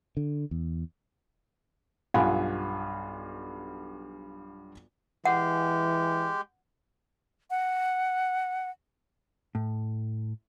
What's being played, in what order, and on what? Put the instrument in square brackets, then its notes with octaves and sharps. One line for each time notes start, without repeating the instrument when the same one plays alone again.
[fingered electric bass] D3
E2
[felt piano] B1 G2 F4 F#5 G#5 B5
[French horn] E3 [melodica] G#3 G4 [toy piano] F#5
[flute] F#5
[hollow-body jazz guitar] A2